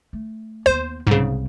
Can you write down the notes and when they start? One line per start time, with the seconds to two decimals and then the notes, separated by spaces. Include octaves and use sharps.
0.13 A3
0.66 D#2 B3 C5
1.07 C2 G#2 C#3 G3